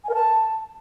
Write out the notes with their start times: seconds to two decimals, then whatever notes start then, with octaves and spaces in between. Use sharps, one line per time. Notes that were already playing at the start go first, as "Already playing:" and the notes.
0.04 G#5
0.09 A#4
0.14 A5